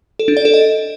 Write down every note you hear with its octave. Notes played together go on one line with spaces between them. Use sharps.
A4
D4
D5
A4
D#5